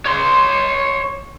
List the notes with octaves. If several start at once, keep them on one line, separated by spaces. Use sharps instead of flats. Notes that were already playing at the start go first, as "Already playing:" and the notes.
C#5 C6